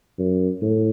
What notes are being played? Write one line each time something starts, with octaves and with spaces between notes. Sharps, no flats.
F#2
A2